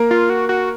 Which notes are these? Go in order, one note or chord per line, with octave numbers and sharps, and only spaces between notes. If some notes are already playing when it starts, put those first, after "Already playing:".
Already playing: A#3 A#4
F4
F#4
F#4